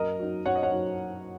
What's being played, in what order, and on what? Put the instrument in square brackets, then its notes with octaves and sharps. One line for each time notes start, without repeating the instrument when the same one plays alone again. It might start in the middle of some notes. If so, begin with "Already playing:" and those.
Already playing: [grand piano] F#2 A#4 D#5
F#3 D#4
F#2 C#5 F#5
D#5
C#5 F#5
F#3 D#4